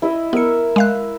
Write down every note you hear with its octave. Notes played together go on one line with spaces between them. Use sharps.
E4 D#5 E5
B3 A#4 E5 C#7
G#3 F5 F#6